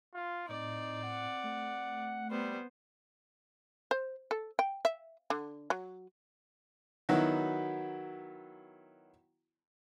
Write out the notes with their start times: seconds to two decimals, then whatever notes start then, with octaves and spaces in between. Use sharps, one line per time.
0.14 F4
0.49 A2 C4 D#4 D5
1.04 F#5
1.44 A3
2.31 G3 B3 C5
3.91 C5
4.31 A4
4.59 G5
4.85 E5
5.30 D3
5.70 F#3
7.09 D#3 F#3 B3 E4 F#4